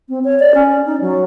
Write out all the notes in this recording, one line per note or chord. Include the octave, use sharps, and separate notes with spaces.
C4
C#5
D5
C#4
D#4
F#3